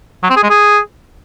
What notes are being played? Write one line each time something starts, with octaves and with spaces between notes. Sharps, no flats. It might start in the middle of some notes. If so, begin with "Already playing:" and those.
F#3
C4
G#4
G#3
G#4